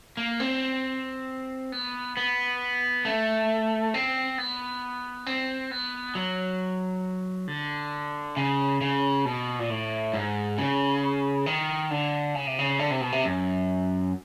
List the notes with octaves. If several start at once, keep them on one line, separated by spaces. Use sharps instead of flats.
A#3
C4
B3
B3
A3
C4
B3
C4
B3
F#3
D3
C#3
C#3
B2
A#2
A2
G#2
C#3
D#3
D3
C#3
C3
C#3
D3
C3
B2
C3
F#2